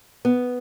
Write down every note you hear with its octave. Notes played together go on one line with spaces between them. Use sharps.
B3